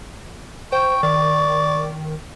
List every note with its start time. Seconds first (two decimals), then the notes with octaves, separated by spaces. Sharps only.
0.72 C5 G5 C#6
1.03 D#3 D5